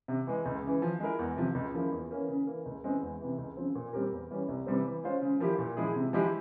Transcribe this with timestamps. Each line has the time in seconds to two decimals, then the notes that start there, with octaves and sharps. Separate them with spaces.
0.08 C3
0.27 E3 G#3
0.46 C#2
0.63 C#3 E3
0.82 F3
1.00 G#3 E4 A#4
1.19 E2
1.37 C3 F3
1.55 C#2
1.74 C#3 F3 A#3 E4
1.92 E2
2.11 E3 A#3 C#4
2.28 C#3
2.47 E3 A#3
2.66 C#2
2.84 C#3 E3 G#3 C4
3.02 E2
3.21 C3 E3
3.38 C#2
3.57 C#3 F3 C4
3.75 A#2
3.93 G3 C4 G4 A#4
4.11 E2
4.31 E3 G3 C#4
4.48 C2
4.66 C3 E3 G3 C4
4.85 E3
5.04 G#3 C#4 F4 C5
5.22 C#3
5.40 F3 A#3 E4 G4
5.58 A#2
5.77 F3 G#3 E4 G#4
5.96 C3
6.13 F3 G#3 E4 G4